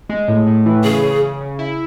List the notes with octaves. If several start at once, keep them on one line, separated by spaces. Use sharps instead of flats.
G#3
A2
A2
E3
C#3 G#4
C#3
C#3
C#3
E4